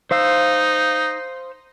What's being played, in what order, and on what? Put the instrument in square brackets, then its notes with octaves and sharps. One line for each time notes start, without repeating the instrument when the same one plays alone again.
[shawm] D#4 [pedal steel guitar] C5 F5 E6